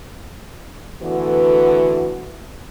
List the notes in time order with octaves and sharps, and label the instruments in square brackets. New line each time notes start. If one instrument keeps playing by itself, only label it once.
[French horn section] D3 E3 A3 B3 F#4 B4